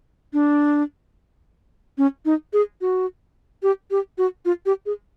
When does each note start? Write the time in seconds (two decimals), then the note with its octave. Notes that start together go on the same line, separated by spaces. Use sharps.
0.33 D4
1.98 C#4
2.25 D#4
2.53 G#4
2.81 F#4
3.63 G4
3.91 G4
4.18 F#4
4.45 F4
4.66 G4
4.86 G#4